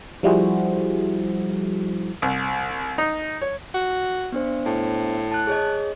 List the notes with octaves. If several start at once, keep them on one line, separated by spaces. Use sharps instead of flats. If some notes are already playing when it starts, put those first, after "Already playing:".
F3 G3 E4 F#4 G#4 C5
C2
D#4
C#5
F#4
B3 D4 C5
A2
A5 F#6
G#4 C#5 D#5